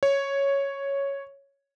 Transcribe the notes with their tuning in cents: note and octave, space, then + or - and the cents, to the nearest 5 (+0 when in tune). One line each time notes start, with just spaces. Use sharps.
C#5 +0